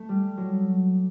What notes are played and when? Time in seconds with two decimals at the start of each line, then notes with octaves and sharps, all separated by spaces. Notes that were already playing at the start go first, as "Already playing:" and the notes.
Already playing: A3
0.09 G3
0.37 F#3